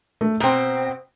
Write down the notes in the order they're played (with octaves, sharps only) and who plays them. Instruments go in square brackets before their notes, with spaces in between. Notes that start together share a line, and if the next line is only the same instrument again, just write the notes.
[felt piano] A3
[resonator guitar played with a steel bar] B2 C4 [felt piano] A#5